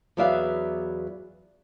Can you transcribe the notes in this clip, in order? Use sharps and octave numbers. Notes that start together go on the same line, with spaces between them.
E2 F#3 B3 D5 E5 F5